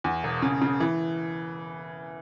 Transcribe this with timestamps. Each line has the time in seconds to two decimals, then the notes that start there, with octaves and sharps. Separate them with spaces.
0.04 E2
0.24 E1
0.42 C#3
0.62 C#3
0.80 E3